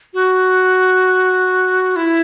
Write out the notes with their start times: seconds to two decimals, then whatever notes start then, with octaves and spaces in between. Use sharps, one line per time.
0.14 F#4
1.96 E4